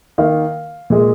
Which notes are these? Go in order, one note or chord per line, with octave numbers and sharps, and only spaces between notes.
D#3 A#3 F5
A#2 G#3